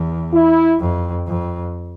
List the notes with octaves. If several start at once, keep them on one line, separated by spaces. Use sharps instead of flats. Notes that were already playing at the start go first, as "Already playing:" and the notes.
Already playing: E2
E4
F2
F2